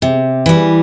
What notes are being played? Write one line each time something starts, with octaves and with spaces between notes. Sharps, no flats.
C3
E3 G3